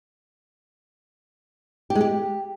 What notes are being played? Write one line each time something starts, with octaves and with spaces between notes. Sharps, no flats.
G4
G#3
G4